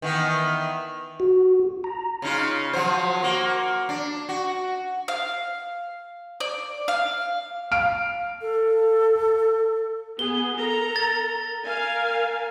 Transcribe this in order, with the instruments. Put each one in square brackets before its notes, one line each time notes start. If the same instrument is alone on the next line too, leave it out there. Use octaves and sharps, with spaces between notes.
[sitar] D#3 E3 B3
[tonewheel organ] F#4
A#5
[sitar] C#3 D#4 F4
F3 F#3 C5
A#3 F#4
D4
F#4
[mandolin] F5
D5
F5
[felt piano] F5 F6 D7
[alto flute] A4
[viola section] B3 G#4 [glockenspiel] G7
[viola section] A4 A#4 A#5
[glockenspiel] A6
[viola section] A#4 F5 G#5